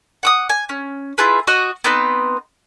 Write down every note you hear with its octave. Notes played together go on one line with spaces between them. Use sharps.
F#5 D6 D#6
G#5
C#4
E4 F4 G#4 B4
F#4 D#5 C#6
B3 C4 D#4 B4